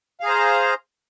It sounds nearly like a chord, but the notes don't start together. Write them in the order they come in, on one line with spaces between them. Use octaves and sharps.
F5 G#4 A#5 C5